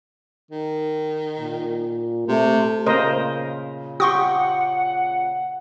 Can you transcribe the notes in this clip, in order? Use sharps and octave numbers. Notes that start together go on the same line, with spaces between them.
D#3
A#2
C3 A3
A#2 C#3 A#4 C5 D#5
G4 F#5 C6 C#6 D#6